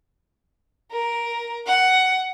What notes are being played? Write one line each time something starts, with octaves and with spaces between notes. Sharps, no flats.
A#4
F#5